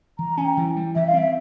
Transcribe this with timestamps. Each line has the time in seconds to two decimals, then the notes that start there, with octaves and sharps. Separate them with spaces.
0.18 E3 A#5
0.37 C#4 G#5
0.45 G5
0.57 E3
0.76 G3
0.95 E3 E5
1.07 F5
1.14 C4 E5